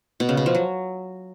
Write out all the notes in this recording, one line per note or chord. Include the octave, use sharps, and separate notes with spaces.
B2
C#3
B2
F3
F#3